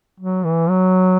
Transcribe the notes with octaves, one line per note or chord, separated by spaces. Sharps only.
F#3
E3
F#3